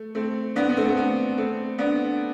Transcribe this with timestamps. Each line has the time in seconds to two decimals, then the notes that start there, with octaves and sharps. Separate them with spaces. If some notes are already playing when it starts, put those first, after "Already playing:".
Already playing: A3
0.15 A3 C4
0.56 B3 D4
0.69 B3
0.77 A3 C4
0.88 A3
0.97 B3
1.38 A3 C4
1.78 B3 D4